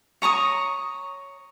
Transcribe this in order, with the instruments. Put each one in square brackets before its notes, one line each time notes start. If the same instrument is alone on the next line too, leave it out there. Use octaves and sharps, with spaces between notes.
[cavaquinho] C#5 A#5 C#6 D#6